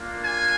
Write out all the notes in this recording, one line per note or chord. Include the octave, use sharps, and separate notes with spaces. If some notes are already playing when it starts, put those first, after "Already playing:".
Already playing: A#3 D4 F4
G#5